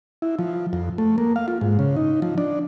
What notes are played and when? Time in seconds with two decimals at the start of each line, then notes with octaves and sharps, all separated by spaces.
0.22 E4
0.39 F3
0.73 F2
0.98 A3
1.18 A#3
1.36 F5
1.48 F4
1.61 G#2
1.79 C#3
1.96 D#4
2.22 F3
2.38 D4